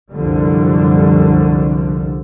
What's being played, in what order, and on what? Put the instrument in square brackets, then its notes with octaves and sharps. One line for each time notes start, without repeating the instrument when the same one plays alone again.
[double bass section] C2 F#2 D3 F3 G3